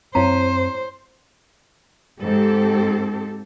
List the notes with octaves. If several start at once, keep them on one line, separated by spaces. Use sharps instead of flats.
F#2 C4 E4 C5 C#5 A#5
G#2 C4 G4 A4